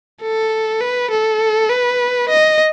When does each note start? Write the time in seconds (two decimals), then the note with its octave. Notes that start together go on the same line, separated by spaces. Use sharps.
0.22 A4
0.81 B4
1.11 A4
1.70 B4
2.29 D#5